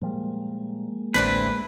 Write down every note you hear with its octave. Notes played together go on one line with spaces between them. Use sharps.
A#2 F3 G3 G#3 A#3
A1 D2 E3 C4 D4 E4 B4